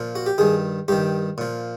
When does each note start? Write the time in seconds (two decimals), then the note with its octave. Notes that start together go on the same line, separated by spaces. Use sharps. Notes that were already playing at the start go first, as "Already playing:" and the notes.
Already playing: A#2 F3
0.15 F#4
0.26 G4
0.38 G2 D#3 G#4
0.88 G2 D#3 G4
1.38 A#2 F3